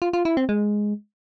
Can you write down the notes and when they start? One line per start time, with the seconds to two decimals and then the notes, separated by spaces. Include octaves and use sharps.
0.02 F4
0.13 F4
0.25 E4
0.37 C4
0.49 G#3